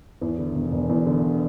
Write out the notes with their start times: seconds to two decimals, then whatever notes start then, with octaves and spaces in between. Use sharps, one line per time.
0.21 E2
0.38 D3
0.55 E1
0.72 E1
0.89 E2
1.06 D3